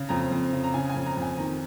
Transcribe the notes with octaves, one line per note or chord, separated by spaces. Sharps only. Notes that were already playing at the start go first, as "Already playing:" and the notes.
Already playing: C#3
F2 A#5
F2
C#3
A#5
C#3 G#5
G#5
F2
A#5
F2
G#5
D#3 A#5